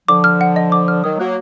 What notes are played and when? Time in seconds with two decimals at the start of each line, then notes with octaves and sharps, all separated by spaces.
0.08 D3 F3 D6
0.24 F6
0.41 F#5
0.56 D#5
0.72 D6
0.88 F6
1.04 D#3 F#3 D#6
1.19 F#3 A#3 F#6